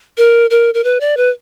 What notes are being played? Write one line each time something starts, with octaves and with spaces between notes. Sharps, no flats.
A#4
A#4
A#4
B4
D5
B4